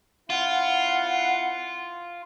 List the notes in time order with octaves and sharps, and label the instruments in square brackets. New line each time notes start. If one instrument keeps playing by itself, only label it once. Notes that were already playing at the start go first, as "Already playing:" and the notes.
[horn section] C4 E4 F#5 [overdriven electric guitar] F4